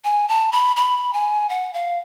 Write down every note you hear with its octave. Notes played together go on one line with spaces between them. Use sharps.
G#5
A5
B5
B5
G#5
F#5
F5